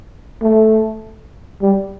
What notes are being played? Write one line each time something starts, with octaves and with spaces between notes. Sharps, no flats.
A3
G3